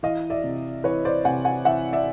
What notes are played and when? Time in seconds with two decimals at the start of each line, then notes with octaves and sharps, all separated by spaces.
0.03 E3 D#5 F5
0.30 D5 E5
0.44 C3
0.84 E3 B4 C#5
1.05 C5 D5
1.25 C3 F#5 G#5
1.45 F#5 G#5
1.65 E3 E5 F#5
1.93 D5 E5